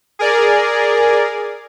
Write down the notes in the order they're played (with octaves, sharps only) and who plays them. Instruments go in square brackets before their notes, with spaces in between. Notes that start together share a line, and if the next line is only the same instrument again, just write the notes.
[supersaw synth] G#4 A#4 D5